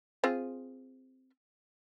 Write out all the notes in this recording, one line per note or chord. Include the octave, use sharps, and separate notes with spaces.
C4 F4 G#4